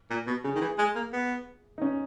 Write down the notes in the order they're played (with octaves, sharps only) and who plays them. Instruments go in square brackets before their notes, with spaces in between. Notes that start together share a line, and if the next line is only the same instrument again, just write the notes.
[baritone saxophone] A#2
B2
[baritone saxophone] C#3 [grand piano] G#4
[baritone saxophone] D#3
E3
G#3
A#3
B3
[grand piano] D#4
C#4